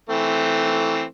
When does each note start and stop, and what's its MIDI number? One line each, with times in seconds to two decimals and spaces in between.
0.09 1.03 52
0.09 1.03 57
0.09 1.03 60